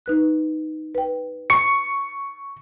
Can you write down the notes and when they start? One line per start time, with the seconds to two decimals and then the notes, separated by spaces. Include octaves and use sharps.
0.06 D#4 B4 F#6
0.95 B4 G5
1.50 C#6 C#7